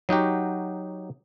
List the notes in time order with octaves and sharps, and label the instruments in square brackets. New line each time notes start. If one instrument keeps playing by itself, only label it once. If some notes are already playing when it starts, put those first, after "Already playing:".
[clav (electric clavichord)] F#3 D#4 F#4 G4